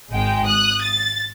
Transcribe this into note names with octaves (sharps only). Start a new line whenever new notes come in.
G#1 G#3 G5
D#6 F#6
A6